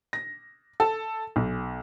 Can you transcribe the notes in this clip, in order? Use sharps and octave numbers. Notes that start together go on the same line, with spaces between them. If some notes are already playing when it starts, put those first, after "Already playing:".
A#6
A4
B1